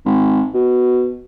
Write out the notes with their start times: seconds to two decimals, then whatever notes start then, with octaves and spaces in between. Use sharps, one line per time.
0.06 G#1
0.54 B2